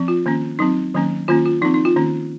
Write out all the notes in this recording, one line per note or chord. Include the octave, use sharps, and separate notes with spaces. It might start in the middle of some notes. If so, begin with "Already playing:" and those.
Already playing: F3 C4
F4
D#3 A#3 C#4
F#3 C4 D#4
D#3 F#3 A#3 C#4
D#3 A#3 C#4 F4
F4
F3 C4 D#4
D#4
F4
D#3 A#3 C#4